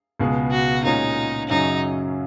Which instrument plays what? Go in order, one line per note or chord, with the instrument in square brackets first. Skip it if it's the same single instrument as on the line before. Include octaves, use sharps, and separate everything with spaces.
[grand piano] C#2 B2 G#3 B3
[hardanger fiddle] F#4
[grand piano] A#2 G#3 C#4 [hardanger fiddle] D#4
[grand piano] F#2 C#3 F#3 C#4 [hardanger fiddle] D#4